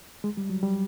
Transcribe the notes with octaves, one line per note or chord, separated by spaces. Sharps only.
G#3
G3
F#3
G3